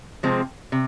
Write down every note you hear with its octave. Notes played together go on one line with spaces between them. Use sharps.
C3 F3 G#3 C4
C3